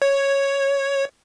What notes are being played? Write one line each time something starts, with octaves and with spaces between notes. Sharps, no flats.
C#5